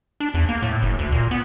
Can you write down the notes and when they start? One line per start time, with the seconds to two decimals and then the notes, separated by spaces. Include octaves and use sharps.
0.20 D4
0.34 E2
0.49 A#3
0.62 A2
0.82 F#1
0.99 D2
1.12 A#2
1.31 B3